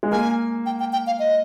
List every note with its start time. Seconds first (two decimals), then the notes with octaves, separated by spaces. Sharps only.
0.03 G#3
0.12 A#3 G#5
0.66 G5
0.80 G5
0.93 G5
1.07 F5
1.19 D#5